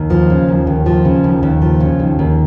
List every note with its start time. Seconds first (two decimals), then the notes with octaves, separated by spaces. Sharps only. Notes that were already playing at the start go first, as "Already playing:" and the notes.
Already playing: D#2
0.10 F3
0.30 C#3
0.49 D#2
0.67 D#2
0.86 F3
1.05 C#3
1.24 D#2
1.43 D#2
1.62 F3
1.80 C#3
2.00 D#2
2.19 D#2